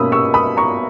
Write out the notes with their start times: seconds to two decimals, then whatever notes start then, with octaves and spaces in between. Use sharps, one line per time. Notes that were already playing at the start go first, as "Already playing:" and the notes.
Already playing: B2 A#3 C#4 B5 D#6 E6
0.12 C#6 E6
0.34 B5 D#6
0.57 A#5 C#6